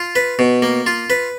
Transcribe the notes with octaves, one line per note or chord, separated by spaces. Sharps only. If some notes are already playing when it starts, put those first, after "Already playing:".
Already playing: F4
B4
B2
A#3
F4
B4